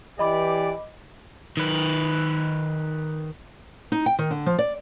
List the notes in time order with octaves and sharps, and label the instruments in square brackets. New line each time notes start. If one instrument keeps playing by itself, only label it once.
[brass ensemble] E3 G4 D5 [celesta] D#5 B5 D6
[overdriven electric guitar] D#3 B4
[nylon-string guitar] D#4
G5
D#3
D3
F3
D5